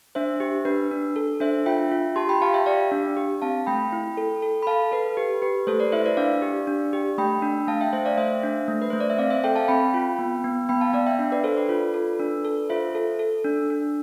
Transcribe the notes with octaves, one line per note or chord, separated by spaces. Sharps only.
D4 C5 E5
G4
D4 B4
D4
A4
D4 C5 E5
F4 E5 G5
F4
G4 A5 C6
G5 B5
G4 F5 A5
E5 G5
G4 D5 F5
D4
G4
C4 F5 A5
A3 G5 B5
E4
A4
A4
B5
A4 F5 A5
A4 B4
G4 B4
G4 B4
A3 A4 C5
B4 D5
E4 C5 E5
B4 D5
D4 D5 F5
G4
D4
G4
A3 G5 B5
D4
A3 F5 A5
E5 G5
A3 C5 E5
D5 F5
A3 C5 E5
D4
A3
B4
A3 C5
D5
E5
C4 D5 F5
C5 E5
A4 E5 G5
F5 A5
C4 G5 B5
F4
B3
B3
B3 G5 B5
F5 A5
B3 D5 F5
E5 G5
D4
B4 D5
A4 C5
B4 D5
F4
A4
D4
A4
F4 C5 E5
A4
A4
D4
D4